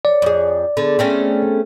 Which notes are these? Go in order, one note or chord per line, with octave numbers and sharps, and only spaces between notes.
C#5 D5
F2 G#4
D3 B3 G#4 A4
A3 C4 C#4